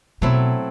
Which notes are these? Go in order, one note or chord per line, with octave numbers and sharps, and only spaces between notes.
B2 F#3 A3 C4 E4